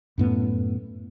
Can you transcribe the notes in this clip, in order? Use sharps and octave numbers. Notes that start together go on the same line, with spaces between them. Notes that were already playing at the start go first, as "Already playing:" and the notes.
F#2 A2 B3